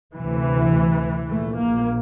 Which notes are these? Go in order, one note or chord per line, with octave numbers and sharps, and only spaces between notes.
D2 C3 E3
A#1 A#2 A3
A#3